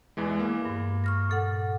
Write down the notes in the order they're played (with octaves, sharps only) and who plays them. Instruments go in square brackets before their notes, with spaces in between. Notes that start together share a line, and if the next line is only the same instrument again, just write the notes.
[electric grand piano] E2 E3 G#3
A#3
[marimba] G2
C#6 F6 A#6
A#2 A4 F#5